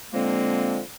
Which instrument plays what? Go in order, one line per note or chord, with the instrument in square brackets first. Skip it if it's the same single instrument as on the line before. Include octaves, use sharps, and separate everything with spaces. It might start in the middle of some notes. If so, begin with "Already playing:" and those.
[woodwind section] D3 F3 G#3 A#3 C4